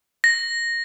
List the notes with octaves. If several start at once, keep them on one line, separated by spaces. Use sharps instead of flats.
A#6